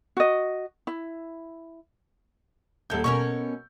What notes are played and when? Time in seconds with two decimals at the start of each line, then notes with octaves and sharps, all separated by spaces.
0.17 F#4 D#5
0.87 E4
2.90 D#1 E4 A4 G6
3.04 B2 C#4 A#4 C#6